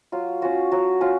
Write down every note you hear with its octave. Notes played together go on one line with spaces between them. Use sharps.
F#3 F4
C#4 F4 F#4
F#3 F#4
C#4 F4